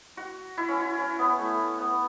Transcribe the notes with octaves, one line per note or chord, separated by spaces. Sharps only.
F#4
E4
C#4
E4
C#4
B3
A3
B3